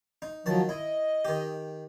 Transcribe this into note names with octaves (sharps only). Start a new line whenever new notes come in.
D#4
D#3 F3 F#3 A5
E4 D#5
D#3 G4